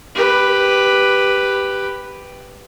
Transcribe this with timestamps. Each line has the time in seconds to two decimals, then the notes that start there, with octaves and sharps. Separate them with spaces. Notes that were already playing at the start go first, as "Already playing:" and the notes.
0.15 G4 B4